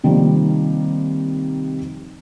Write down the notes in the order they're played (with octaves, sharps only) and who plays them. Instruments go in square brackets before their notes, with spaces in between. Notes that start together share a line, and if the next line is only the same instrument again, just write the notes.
[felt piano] C3 D#3 F3 G3 A#3 C4